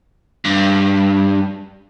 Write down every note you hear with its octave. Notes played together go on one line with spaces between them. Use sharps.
G2